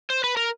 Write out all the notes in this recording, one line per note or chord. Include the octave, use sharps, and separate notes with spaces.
C5
B4
A#4